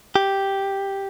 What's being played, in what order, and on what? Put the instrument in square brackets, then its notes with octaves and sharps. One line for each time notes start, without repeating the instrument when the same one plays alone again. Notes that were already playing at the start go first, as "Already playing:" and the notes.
[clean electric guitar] G4